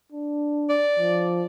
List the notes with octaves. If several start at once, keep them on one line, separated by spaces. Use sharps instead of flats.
D4
D5
F3